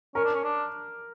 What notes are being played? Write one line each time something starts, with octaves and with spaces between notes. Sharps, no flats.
C#4 A#4
D4
C#4
D4